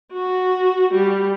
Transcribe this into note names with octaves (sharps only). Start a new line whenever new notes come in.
F#4
G3